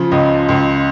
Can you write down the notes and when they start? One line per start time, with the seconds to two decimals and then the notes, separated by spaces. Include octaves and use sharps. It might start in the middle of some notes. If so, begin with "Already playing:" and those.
Already playing: C#3 F3
0.11 C#2 D#5
0.49 C#2